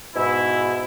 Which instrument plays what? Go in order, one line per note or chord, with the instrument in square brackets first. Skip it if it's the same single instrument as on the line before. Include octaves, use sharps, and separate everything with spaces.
[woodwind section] G#2 B2 E4